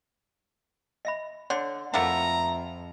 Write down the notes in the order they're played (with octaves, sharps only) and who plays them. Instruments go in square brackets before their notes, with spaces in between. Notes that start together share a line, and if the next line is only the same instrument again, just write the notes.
[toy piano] D#5 E5 B5
[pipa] D3 [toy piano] C#5 D5 C6
[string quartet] F2 [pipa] A3 A#3 E4 [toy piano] F#5 A5 [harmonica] A#5